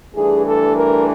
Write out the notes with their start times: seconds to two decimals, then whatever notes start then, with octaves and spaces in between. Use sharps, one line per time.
0.15 G2 E3 A3 D4 G#4
0.45 A4
0.75 A#4